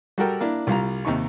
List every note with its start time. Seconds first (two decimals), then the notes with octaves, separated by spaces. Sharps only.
0.18 G3 F#4 A4 A#4 G5
0.41 A#3 D4 E4
0.67 C2 G3 F4 A#5
1.05 D#2 C3 D#4 C#6